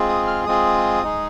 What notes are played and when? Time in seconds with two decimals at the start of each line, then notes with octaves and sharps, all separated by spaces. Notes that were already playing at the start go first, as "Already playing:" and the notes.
Already playing: G#3 C4 F4 G#4
0.09 D#6
0.27 F6
0.47 G#3 C4 F4 G#4 D#6
1.03 G#3 D#4 G#4